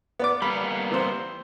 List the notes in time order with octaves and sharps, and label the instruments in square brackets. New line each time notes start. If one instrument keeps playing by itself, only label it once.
[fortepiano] B3 D5 D6
[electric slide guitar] G3 A#3 B3 [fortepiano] B5
[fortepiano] E3 C4 C5